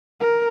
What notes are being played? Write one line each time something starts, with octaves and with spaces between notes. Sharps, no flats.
A#4